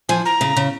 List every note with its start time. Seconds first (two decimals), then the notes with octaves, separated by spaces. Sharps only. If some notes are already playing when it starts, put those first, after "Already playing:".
0.09 F3 G#5
0.25 A#5
0.41 C#3
0.57 C#3